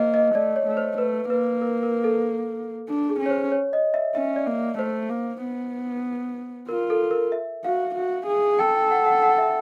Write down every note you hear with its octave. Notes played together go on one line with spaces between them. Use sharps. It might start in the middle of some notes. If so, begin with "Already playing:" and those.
Already playing: A#3 C5 D#5
D#5
A3 D5
C#5
A3
C5
A3 B4
A#3 B4
A#4
A#4
A4
D4
G#4
C#4
C#5
C5
C#5
D#5
E5
C#4 E5
D5
A#3
A3 C5
A#3
B3
F4 A#4
A4
A#4
E5
F#4 F5
F#4
G#4
A4 G5
G5
F#5
F#5
F#5
E5